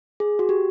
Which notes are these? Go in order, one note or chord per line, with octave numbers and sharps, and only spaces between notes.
G#4
F#4
G4